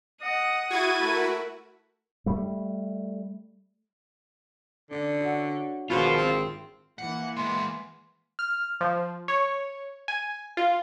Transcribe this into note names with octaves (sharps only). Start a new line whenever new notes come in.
D#5 F#5 D#6
E4 F#4 G#4 G#6 A6 D#7
A3 A#4 B5
G3 A3
D3 D4
F#4 C#5 E5
G#1 B2 F4 G#4 C5
C4
E3 A#3 F#5
G#3 B3 C6
F6
F3
C#5
G#5
F4